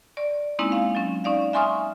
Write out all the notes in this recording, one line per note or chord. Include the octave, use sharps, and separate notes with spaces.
D5
G#3 A#3 C4 C#4 D#4 E4
F5
F#3 C#4
C#4 D#4 D5 F5
E5 G#5 C6 C#6 D#6 F6